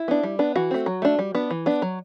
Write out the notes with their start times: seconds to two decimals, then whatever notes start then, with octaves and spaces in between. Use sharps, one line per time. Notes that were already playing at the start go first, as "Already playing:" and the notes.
Already playing: E4
0.08 B3 D4
0.23 G3
0.39 B3 D4
0.56 E3 F#4
0.71 A3 C4
0.86 F#3
1.02 A3 D4
1.19 G3
1.35 B3 D4
1.51 E3
1.66 B3 D4
1.82 F#3